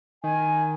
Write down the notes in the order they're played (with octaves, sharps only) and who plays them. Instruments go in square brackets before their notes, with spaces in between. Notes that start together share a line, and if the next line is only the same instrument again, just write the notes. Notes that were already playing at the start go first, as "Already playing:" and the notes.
[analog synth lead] D#3 [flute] G#5